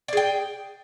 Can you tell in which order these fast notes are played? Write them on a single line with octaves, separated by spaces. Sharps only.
D5 G#4 G5